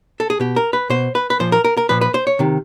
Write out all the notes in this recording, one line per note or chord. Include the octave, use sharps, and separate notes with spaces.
A4
G#4
B2 G4
A#4
B4
B2 C5
B4
B4
A#2 F3 C5
A#4
A#4
A#4
A#2 F3 B4
B4
C5
C#5
C3 D#3